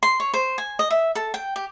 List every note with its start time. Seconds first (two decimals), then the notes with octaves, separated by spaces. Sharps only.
0.03 C6
0.20 C#5
0.34 C5
0.58 G#5
0.79 D#5
0.90 E5
1.15 A4
1.34 G5
1.56 G4